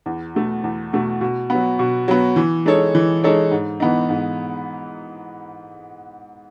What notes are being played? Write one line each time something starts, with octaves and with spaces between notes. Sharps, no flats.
E2
B2 A3
E2
B2 A3
B2
F#3 B3
B2
F#3 B3
E3
G#3 D#4 A4 C#5
E3
G#3 D#4 A4 C#5
G#2
E3 B3 D#4
G#2